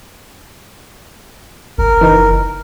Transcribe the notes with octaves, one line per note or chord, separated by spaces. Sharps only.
F#1 A#4
E3 D#4